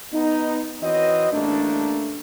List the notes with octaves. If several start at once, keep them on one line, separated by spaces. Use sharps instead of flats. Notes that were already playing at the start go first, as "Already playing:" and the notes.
B3 D#4
E3 C4 F#4 B4 C#5 D#5
A1 G2 A3 A#3 C#4 D4